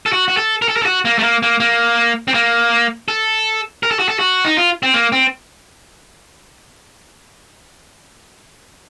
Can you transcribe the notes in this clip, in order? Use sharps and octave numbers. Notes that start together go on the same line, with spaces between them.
A4
F#4
F#4
A4
A#4
A4
A#4
A4
F#4
A#3
A3
A#3
A#3
A#3
C4
A#3
A4
A#4
A4
F#4
A4
F#4
D#4
F4
C4
A#3
C4